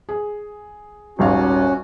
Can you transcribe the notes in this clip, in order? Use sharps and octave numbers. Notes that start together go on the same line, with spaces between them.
G#4
D#1 G#1 C#4 F#4 F5